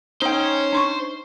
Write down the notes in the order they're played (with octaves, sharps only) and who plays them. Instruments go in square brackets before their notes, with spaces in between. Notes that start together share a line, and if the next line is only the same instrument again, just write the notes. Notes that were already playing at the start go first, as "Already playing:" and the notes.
[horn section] C#4 [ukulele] D#4 G5 [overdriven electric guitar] C5
[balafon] D4 C6 C#6